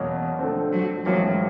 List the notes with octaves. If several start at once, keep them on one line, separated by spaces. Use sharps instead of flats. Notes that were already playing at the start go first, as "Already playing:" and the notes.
Already playing: E2 B2 F#3 A#3 C#4
D3 F3 A3 C4
F#3
A1 G#2 F3 F#3 A#3 C#4